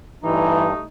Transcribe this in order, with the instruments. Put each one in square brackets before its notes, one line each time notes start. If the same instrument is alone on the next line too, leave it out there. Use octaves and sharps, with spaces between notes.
[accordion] G2 [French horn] E3 [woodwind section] G3 A3 D#4